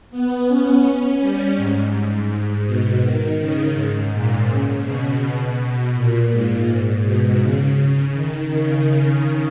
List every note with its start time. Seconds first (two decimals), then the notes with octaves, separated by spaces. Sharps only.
0.11 B3
0.48 C#4
1.21 G3
1.57 G#2
2.30 G#2
2.66 B2
3.03 D#3
3.39 C#3
3.75 G#2
4.12 A#2
4.48 C#3
4.84 B2
5.21 B2
5.94 A#2
6.30 G#2
6.67 G#2
7.04 B2
7.40 C#3
7.77 C#3
8.13 D#3
8.50 C#3